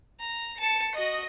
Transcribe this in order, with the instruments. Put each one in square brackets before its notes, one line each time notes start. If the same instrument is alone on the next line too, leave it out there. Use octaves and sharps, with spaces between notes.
[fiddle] A#5
[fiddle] A5 [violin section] C#7
[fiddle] F#4 [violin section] D#5